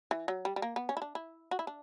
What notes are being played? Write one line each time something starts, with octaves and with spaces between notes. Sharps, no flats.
E3
F#3
G3
G3
A#3
B3
C#4
E4
D4
E4
F#4
E4
D4